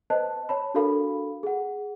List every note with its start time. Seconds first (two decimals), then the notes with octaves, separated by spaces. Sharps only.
0.10 B4 C5 D#5 A5 F#6
0.49 C#5 A5 B5
0.74 D4 F#4 A4 A#4 F5 B5
1.43 G#4 F#5